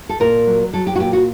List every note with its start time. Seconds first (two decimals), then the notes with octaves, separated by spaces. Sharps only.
0.09 A4
0.20 A#2 A#4
0.47 F#3
0.73 F#3 A4
0.87 G4
0.96 F#4
1.00 A#2 G4
1.13 F#4